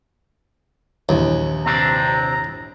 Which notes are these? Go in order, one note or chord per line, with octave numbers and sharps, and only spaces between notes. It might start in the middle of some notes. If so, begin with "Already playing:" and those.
A#1 D#2 E3
C3 C4 D4 A#5